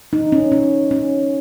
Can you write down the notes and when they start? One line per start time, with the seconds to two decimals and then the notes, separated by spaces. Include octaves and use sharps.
0.13 D#4
0.32 C#4
0.52 C#4
0.91 C#4